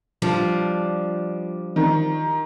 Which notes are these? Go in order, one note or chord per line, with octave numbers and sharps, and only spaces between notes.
F3 G3 D4
D#3